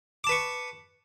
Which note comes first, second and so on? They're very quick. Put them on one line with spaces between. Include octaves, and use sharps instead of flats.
D6 A5 B4 C#6